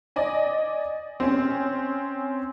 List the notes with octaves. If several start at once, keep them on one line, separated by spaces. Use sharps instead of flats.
D5 D#5 G#5
C4 C#4